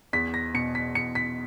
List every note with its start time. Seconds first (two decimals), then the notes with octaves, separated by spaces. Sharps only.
0.13 E2 B6
0.34 A#6
0.54 B2 C#7
0.75 B6
0.95 E2 C#7
1.15 B6